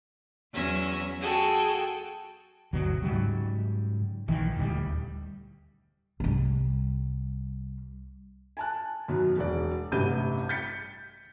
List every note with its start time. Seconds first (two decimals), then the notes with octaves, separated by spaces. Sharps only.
0.52 E2 F#3 C#4 E5 A#6
1.19 F#4 G#4 A4 G5
2.73 G1 D2 B2 F#3
3.03 G#2 C#3 F#3 G3
4.28 A#1 D#3 E3
4.57 D#1 D2 F#3 G3
6.20 C2 G3
8.57 G#5 A5 F#6
9.08 F#2 B2 D#3 F#3
9.38 E1 D5
9.92 A1 G2 C3 G6 D#7
10.49 G6 A6 B6 C#7